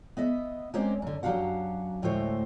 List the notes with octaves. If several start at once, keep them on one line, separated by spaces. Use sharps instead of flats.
B3 D#5 E5
G#3 A#3 C4 C#4 C5 D5
F#2 D3
F#2 F#3 D4 G4 F5 F#5
D2 A2 G#3 A3 C5 C#5